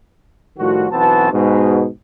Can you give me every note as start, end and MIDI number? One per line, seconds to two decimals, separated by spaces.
0.58 0.86 45
0.58 0.86 51
0.58 0.86 53
0.58 0.86 55
0.58 0.86 66
0.92 1.29 35
0.92 1.29 52
0.92 1.29 59
0.92 1.29 60
0.92 1.29 66
0.92 1.29 81
1.32 1.86 44
1.32 1.86 47